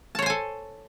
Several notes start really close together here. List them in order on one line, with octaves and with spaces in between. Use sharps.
A5 C#5 C5 G#5 A4